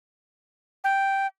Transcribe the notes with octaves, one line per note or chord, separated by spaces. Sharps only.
G5